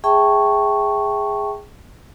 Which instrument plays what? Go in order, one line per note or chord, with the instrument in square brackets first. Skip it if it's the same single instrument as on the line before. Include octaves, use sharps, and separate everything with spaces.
[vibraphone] G#4 E5 G5 A5 C#6